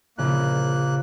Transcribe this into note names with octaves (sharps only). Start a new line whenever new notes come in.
A#1 C#3 A#3 F#6